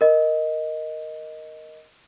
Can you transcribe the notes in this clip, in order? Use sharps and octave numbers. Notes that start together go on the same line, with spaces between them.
A#4 D#5